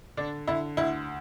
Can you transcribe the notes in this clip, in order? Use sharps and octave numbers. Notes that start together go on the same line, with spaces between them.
D3 D4
D3 E4
D2 E4